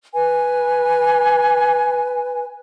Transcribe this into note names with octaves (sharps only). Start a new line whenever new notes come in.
B4 G#5